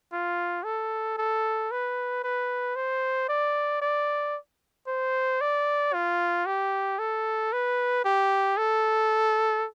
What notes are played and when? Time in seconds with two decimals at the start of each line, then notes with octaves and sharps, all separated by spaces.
0.13 F4
0.64 A4
1.18 A4
1.71 B4
2.24 B4
2.76 C5
3.29 D5
3.82 D5
4.87 C5
5.41 D5
5.93 F4
6.46 G4
6.99 A4
7.53 B4
8.05 G4
8.57 A4